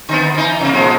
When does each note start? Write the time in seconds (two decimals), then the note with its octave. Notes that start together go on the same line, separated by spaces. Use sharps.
0.09 D3 B3
0.35 E3 D#4
0.61 C3 A#3
0.73 A#2 F3 G#3